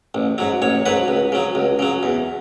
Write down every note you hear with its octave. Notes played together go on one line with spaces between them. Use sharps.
A1
G#2 F#3
A1 C#5
G#2 F#3 B4
C#2
C#3 F#3
C#2
C#3 F#3
E2